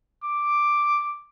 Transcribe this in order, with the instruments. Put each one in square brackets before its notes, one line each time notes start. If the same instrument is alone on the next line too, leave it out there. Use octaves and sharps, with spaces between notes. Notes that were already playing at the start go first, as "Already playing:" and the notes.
[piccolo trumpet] D6